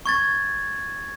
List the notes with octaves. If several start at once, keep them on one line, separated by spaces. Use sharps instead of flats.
C#6 G#6 A6